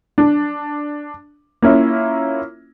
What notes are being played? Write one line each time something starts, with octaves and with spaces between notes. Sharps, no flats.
D4
A#3 C#4 E4 F4